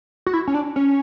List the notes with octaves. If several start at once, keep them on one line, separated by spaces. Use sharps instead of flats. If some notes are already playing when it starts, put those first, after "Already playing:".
F#4
E4
C#4
D4
C#4